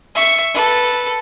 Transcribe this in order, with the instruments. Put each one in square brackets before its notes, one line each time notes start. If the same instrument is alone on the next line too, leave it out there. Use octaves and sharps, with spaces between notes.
[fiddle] E5 C#6
A4 B4